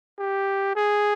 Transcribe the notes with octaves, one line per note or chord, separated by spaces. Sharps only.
G4
G#4